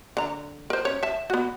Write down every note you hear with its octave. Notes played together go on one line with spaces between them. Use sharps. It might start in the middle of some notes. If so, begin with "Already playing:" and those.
D3 A#5
A#4 C5
C#4 C#5
E5 A5
B3 F#4